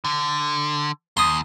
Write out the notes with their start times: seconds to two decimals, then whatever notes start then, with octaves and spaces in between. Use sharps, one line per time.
0.05 D3
1.17 D#2 C6 D#6